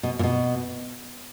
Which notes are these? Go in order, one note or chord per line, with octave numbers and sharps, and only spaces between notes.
B2
A#2
B2